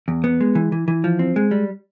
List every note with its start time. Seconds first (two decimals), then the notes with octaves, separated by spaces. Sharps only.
0.08 E2
0.24 B3
0.41 G#3
0.55 E3
0.72 E3
0.88 E3
1.04 F3
1.19 C4
1.36 G#3
1.51 G3